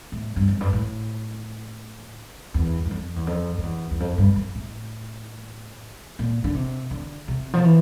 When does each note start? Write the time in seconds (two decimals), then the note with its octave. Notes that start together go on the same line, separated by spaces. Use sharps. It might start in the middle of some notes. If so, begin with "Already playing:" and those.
0.12 A2
0.36 G2
0.48 F2
0.60 G2
0.73 A2
2.54 E2
2.86 G2
2.91 F2
3.16 E2
3.27 F2
3.58 F2
3.63 E2
3.91 E2
4.00 F2
4.18 G2
4.36 F2
4.55 A2
6.19 A#2
6.44 D3
6.54 C3
6.91 D3
7.28 C3
7.53 F3
7.65 E3